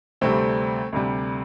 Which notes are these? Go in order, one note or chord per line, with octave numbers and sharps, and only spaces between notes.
D2 C3 G3 A3 C4
D2 C3 G3